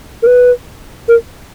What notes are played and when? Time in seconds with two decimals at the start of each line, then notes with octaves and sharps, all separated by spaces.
0.23 A#4
0.27 B4
1.08 A#4